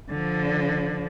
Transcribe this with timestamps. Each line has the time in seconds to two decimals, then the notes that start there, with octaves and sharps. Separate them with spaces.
0.10 D3 F3